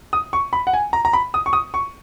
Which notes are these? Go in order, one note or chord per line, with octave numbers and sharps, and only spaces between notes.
D#6
C#6
B5
F#5
G#5
A#5
A#5
B5
D#6
C#6
D#6
C#6